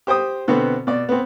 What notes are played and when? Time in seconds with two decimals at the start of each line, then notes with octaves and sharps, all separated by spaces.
0.07 G4 C5 G5 D#6
0.48 B2 D3 B3 C4
0.87 B2 D5
1.09 B3 C4